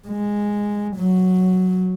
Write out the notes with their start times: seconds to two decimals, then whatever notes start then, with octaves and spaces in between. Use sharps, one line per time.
0.08 G#3
0.96 F#3